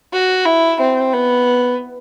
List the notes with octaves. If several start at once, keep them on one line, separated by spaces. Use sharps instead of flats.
F#4
E4
C4
B3